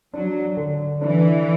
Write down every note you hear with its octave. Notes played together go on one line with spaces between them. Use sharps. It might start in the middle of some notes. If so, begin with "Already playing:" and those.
F#3 D4
D3
E3 D4